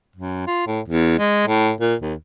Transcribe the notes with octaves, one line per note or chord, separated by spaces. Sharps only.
F#2
F4
A2
E2
G#3
A2
A#2
D#2